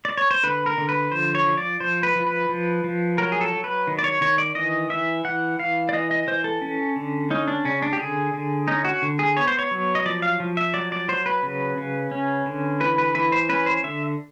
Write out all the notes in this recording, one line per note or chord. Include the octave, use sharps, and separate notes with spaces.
D5
C#5
C5
D3 B4
A#4
D3
B4
F3 C5
C#5
F3
D5
F3 C5
B4
F3
B4
F3
F3
F#3 A#4
G#4
A4
F#3
B4
D#3
D5
C#5
D#3 C#5
D5
E3 D#5
E3 E5
E3 F#5
E3 F5
D5
E3 D#5
D#5
E3 C5
A4
C#4
D3
C#4 D#4
D4
C#3 C#4
D4
G4
D3 G#4
D3
C#4 D#4
F#4
D3
G#4
B3 C#5
C5
C#5
F#3
D#5
F3 D5
F5
F3
E5
F#3 D5
D5
F#3 C5
B4
C#3
C#3
C#4
D3
E3 B4
B4
E3 B4
C5
C#4 B4
C5
D3 E5